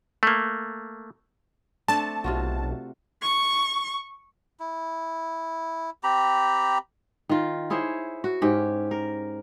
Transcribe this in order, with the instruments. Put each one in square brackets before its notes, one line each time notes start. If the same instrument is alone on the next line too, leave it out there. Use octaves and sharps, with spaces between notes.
[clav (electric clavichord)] A3 A#3
[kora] A3 C4 D4 [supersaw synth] A5
[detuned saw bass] B1 [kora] C3 F4 F#4
[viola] C#6
[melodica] E4
C4 G4 A#5 B5
[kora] D#3 F4
E4 G#4 C5 C#5
F#4
G#2 C#4 G4
A#4